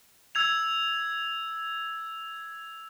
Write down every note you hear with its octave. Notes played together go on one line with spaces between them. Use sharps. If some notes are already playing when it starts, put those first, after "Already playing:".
E6 G#6 F7